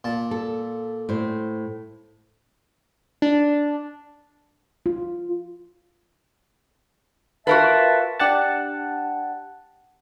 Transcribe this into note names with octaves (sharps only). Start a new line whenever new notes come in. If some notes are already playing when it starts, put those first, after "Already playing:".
A#2 A5
A4
A2 C5
D4
F4
F4 F#4 A#4 B4 E5 A5
D4 G4 F#5 A5